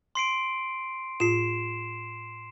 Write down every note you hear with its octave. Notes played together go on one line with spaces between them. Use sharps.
C6 C7 D7
A2 F4 C7 E7